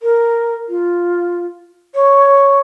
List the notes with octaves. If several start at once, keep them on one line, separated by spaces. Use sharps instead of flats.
A#4
F4
C#5